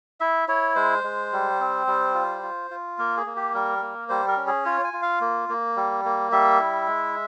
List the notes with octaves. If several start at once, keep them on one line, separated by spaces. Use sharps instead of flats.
E4 E5
E4 C#5
G#3 C5
G#3
G3
C4
G3
F4
F4
F4
A#3 A#4
G#4
A#3
G4
G3 A#4
A#3
G3 C5
A#4
C#4
G#4
F4 C#5
G#5
F4
F5
A#3
A#3
G3
A#3
G3 E5
E4
G#3